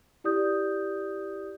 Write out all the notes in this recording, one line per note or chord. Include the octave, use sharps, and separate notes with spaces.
E4 G4 D5 D#6 G6